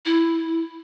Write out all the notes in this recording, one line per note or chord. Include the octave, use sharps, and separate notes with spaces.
E4